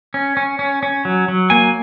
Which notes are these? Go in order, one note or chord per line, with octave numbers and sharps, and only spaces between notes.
C#4
C#4
C#4
C#4
F#3
F#3
A#3 G#5